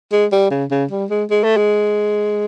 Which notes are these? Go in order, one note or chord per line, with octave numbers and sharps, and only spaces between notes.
G#3
G3
C#3
C#3
G3
G#3
G#3
A3
G#3